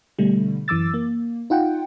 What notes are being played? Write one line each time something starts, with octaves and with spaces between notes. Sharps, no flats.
B2 D3 G3 A3
F#2 E3 D6 E6 A6
A#3
D#4 F4 F#5 G5